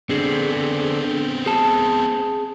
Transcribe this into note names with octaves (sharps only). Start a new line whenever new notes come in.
D3 B3 C4 G#4
G#4 A5